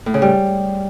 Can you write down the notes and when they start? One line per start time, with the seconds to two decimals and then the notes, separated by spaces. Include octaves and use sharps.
0.06 A2
0.14 C#3
0.22 G3